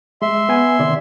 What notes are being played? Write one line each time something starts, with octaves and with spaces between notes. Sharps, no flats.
G#3 E5 C6
B3 G#5
C3 D#3 D5